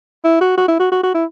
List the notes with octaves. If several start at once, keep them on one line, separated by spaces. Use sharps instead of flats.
E4
F#4
F#4
E4
F#4
F#4
F#4
E4